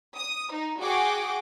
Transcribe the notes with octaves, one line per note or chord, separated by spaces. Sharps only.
D#6
D#4
F#4 G#4 F#5 G5 D6